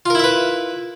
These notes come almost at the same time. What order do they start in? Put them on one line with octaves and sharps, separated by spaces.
F4 A#4 E4 E5 B4